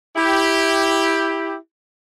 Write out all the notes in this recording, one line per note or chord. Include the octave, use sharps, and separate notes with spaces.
E4 G4